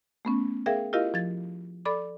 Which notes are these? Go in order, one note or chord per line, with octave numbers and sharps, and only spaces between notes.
A3 B3 C#4
G#4 A#4 E5 F5 G5
E4 F4 G4 A#4 D#5 F5
F3 G#6 A6
A4 D5 B5 D6